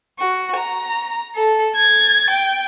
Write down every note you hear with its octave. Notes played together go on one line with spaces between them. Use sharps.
F#4
A#5
A4
G#6 A6
G5